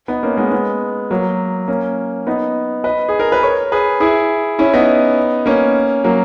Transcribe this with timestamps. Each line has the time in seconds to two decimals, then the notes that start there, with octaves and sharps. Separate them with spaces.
0.08 B3 D#4
0.23 A#3 C#4
0.37 G#3 B3
0.52 G#3 B3
1.11 F#3 A#3
1.68 A#3 C#4
2.27 B3 D#4
2.84 B4 D#5
3.08 G#4
3.20 A#4
3.32 B4
3.43 A#4 C#5
3.72 G#4 B4
4.00 E4 G#4
4.59 C#4 E4
4.73 B3 D#4
5.46 A#3 C#4
6.04 F#3 A#3